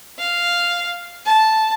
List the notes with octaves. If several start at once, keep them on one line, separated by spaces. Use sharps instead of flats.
F5
A5